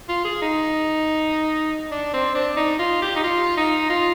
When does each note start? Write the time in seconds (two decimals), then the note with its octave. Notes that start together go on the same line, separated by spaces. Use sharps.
0.08 F4
0.24 G#4
0.42 D#4
1.91 D4
2.13 C4
2.35 D4
2.56 D#4
2.79 F4
3.02 G4
3.16 D#4
3.23 F4
3.57 D#4
3.89 F4